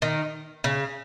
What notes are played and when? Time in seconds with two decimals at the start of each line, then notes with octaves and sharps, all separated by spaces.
0.02 D#3
0.64 C#3